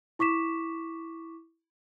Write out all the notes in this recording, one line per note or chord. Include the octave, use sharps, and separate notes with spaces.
E4 C#6 D6 B6 E7